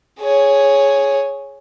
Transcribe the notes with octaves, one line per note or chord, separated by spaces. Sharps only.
G#4 C#5